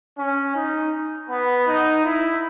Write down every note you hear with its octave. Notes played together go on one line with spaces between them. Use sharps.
C#4
D#4
B3
D#4
E4